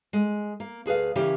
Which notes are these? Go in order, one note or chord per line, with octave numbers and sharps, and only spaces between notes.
G#3
A#3
D2 G#4 B4 F5
C#3 E3 C#4 G4 A#4